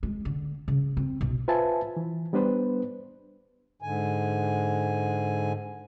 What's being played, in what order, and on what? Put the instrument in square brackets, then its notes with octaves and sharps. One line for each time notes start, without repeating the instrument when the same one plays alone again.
[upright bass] G#3
D3
C#3
C4
B1
[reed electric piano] F4 B4 C5 E5 G#5 A5
E3
G3 B3 D4 B4 C5
[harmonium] G#2 D3 G#5